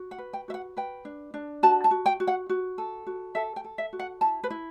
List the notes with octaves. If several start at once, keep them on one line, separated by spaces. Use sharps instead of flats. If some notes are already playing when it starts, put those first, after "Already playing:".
Already playing: F#4
F#5
B4
G5
F#4 E5
F#5
B4 G5
D4
D4
F#4 A5
A5
F#4
G5
F#4
F#5
F#4
A4
F#4
A4 E5
G5
A4
E5
F#4
F#5
E4 A5
B4
E4